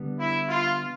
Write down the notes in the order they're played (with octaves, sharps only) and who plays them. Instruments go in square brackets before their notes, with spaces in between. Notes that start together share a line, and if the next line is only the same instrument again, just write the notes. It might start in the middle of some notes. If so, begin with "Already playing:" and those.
Already playing: [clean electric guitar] D3 G3 B3
[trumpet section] E4
F4